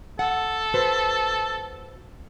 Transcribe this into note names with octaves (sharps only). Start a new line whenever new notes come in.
A4 F#5
F#4 B4 C5